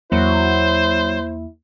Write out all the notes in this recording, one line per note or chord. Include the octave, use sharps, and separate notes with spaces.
E2 F#3 A#3 E4 C5